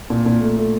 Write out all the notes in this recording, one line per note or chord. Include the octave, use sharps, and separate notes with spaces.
A#2
A#2
A3
A3